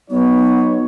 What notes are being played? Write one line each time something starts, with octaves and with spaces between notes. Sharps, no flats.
F#3 B3 D#4 C#5